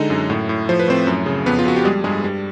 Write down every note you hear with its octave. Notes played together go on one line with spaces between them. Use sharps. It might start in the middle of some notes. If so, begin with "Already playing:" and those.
Already playing: D3 G#3 D#4 D#5
F#2
A2
A2
F3 C5
B4
A2 C4 C5
F#2
C#3
F2 B3 B4
F4
F2 F#4
G4
G3 G#3 G#4
G2 G#3 G#4
G3